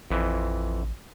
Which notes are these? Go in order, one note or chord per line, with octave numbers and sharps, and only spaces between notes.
A1 F2 E3